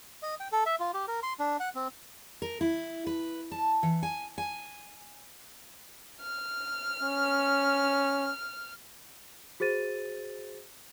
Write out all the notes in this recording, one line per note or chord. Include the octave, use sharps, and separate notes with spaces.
D#5
G5
A4
E5
F4
G4
A#4
C6
D4
F#5
C4
A#4
E4
B4
A5
E3
G#5
G#5
F6
C#4
F#4 G#4 C5 A6 D#7